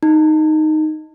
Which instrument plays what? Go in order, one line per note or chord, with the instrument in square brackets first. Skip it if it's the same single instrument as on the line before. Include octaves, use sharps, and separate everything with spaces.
[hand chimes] D#4